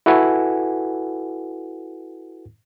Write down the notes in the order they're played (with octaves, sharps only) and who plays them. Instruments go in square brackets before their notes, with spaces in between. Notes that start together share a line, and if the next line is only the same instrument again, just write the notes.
[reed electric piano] E4 F#4 A4 B4 F#5 G#5